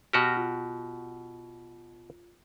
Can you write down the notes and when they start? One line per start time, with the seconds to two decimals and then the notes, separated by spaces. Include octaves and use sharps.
0.13 B2 F#4 G4 F6 A#6
0.37 F4